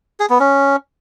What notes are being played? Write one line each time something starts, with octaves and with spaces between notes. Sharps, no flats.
G#4
B3
C#4